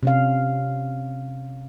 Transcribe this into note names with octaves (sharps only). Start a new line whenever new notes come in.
C3 C#4 F5